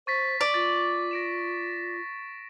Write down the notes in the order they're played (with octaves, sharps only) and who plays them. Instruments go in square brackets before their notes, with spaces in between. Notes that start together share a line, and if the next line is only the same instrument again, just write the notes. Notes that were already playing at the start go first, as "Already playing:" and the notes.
[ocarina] C5 [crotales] C#6 A6 B6
[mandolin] D5
[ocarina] F4 [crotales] A6
[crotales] A#6 D7 E7